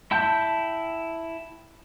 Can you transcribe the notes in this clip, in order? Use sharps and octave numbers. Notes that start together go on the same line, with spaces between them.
E4 G5 A5 G6